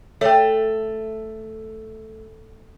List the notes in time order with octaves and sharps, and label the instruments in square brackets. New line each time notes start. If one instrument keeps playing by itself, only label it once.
[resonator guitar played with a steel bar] A3 [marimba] C#5 G5